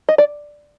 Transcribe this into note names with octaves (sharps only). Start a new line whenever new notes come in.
D#5
D5